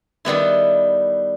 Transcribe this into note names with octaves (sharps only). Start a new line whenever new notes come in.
D#3 G3 B3 E4